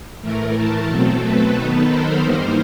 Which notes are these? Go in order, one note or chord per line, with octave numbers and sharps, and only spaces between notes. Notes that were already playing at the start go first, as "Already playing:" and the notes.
A2 E3 A3 A#4
A4
B2 F#3 A3 C4
A4 B4
D#3 F#3 B3 D#4 A4 B4
A#4 C5
G2 E3 G3 A#3 D#4